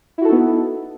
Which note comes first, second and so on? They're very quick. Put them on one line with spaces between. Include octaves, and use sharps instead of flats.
E4 F#4 A4 D#4 B3